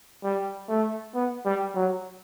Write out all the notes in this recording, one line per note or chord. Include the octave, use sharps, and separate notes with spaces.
G3
A3
B3
G3
F#3